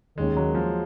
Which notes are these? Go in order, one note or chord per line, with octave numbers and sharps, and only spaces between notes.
D#2 D#3 G#3 A#3 C#4
F#3
F3